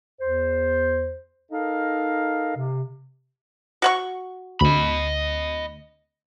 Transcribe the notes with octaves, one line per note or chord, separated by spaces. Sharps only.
E2 C5
D#4 A4 A#4 D#5 F5
C3
F#4 F#5 C#6
D2 D#5 B5